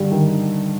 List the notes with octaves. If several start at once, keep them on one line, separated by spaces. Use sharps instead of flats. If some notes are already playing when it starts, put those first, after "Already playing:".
Already playing: G2 D3 G3
D#3